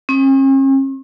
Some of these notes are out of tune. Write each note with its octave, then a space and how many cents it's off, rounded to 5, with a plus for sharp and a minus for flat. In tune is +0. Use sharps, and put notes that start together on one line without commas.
C#4 -45